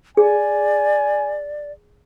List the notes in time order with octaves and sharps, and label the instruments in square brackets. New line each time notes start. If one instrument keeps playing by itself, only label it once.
[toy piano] G#4 [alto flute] D5 [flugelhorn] G#5